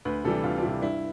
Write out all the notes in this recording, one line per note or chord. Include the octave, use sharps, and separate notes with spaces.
D2 B4
C3 E3 G3 A4
D2 F4
D4
C3 E3 G3 E4
G2 E4